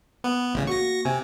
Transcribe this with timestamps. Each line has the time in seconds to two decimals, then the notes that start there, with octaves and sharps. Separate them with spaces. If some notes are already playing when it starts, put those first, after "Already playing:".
0.24 B3
0.54 A1 C#3
0.67 A#3 F#4 C#6 A#6
1.05 C3 G#5